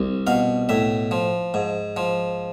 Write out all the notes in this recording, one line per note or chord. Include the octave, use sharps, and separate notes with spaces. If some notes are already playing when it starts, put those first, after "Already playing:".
Already playing: C2
B2 F5
A2 E5
F3
G#2
F3